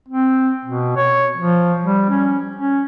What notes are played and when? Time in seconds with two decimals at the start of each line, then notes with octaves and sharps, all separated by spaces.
0.08 C4
0.65 B2
0.96 C#5
1.37 F3
1.83 G3
2.10 C#4
2.56 C#4